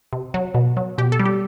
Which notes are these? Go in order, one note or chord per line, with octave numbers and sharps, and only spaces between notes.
C3
F#3
B2
F#3
B2 G4
A4
G3
G4